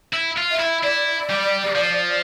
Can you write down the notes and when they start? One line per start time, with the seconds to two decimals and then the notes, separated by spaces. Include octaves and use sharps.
0.13 E4
0.37 F4
0.51 E5
0.59 E4
0.83 E4 D5
1.29 G3
1.75 F3